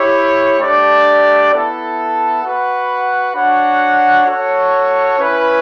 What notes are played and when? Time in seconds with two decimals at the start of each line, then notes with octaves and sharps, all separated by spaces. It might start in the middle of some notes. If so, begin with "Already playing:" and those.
Already playing: E4 G4 C#5
0.58 A3 D4 G4 D5
1.50 B3 E4 A4 E5
2.41 F#4 B4 F#5
3.34 D4 F#4 C#5 F#5
4.25 F#4 A4 C#5
5.18 C#4 E4 B4